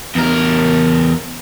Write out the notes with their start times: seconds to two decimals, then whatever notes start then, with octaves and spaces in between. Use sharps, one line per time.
0.16 E2 A#4